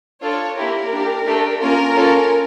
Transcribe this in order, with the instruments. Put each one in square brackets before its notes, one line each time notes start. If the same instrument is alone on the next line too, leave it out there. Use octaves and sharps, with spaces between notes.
[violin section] D4 F4 A4 C#5
A#3 E4 G4 A#4
D4 G4
A3 D4 G4
A#3 C#4 F4 A#4
C#4 F4 A4